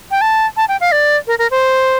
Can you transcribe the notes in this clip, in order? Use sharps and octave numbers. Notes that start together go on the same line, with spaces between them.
G5
A5
A5
G5
F5
D5
A#4
A#4
C5